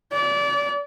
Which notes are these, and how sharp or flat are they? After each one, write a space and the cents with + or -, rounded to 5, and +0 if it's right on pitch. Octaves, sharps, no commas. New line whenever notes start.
D5 -30